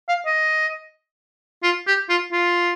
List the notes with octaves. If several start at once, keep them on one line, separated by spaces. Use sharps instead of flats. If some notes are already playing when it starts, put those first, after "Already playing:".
F5
D#5
F4
G4
F4
F4